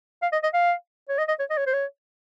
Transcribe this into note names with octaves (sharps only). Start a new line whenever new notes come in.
F5
D#5
D#5
F5
C#5
D#5
D#5
C#5
D#5
C#5
C5
C#5